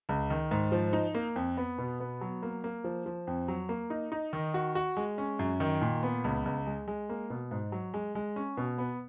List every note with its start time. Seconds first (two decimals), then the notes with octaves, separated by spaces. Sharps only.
0.09 C#2
0.30 D#3
0.51 G#2
0.72 F3
0.93 D#4
1.15 A#3
1.36 F2
1.57 B3
1.78 B2
2.00 B3
2.21 F#3
2.43 A#3
2.64 A#3
2.84 F3
3.06 F3
3.27 F2
3.48 F#3
3.69 A#3
3.90 D#4
4.12 D#4
4.33 D#3
4.54 F#4
4.75 F#4
4.97 G#3
5.18 C#4
5.39 F#2
5.60 D#3
5.82 A#2
6.03 B3
6.24 C#2
6.45 C#2
6.67 G#3
6.88 G#3
7.09 A#3
7.30 B2
7.51 G#2
7.72 F#3
7.94 G#3
8.15 G#3
8.36 C#4
8.57 B2
8.78 B3